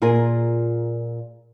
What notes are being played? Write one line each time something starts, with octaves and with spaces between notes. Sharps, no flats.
A#2 F4 G#4 A#4 G#5